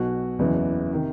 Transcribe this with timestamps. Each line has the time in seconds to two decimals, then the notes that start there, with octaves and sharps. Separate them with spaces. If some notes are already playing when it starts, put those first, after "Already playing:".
Already playing: B1 B2 F#4
0.39 F#1 E2 C#3 E3
0.92 C3 D#3